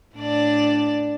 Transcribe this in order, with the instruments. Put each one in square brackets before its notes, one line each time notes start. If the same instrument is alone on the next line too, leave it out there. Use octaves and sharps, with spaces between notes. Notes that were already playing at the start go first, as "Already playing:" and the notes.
[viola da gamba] A2 D4 D5